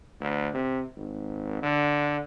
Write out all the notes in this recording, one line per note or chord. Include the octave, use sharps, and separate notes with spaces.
D2
C3
G#1
D3